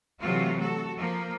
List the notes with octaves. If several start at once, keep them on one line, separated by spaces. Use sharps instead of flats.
C3 E3 F#3 A3 F4 F#4
F#4 A4
F3 A#3